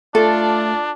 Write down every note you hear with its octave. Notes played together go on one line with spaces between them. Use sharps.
A3 D4 F4 A4 D5 A5